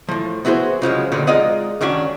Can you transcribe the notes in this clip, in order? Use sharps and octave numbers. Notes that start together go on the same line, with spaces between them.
A2 F3
B3 E4 F#4 G#4 C5
C#3 F3 F#3 G#3
G2 A#2 D3 D#3 F#3 G3
G#3 D#4 F4 D5 D#5 F#5
G2 D#3 C#4 D4 F#4